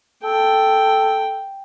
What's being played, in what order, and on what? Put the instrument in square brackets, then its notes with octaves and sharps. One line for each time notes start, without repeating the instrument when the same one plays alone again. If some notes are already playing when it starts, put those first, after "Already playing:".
[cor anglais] A4 [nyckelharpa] G5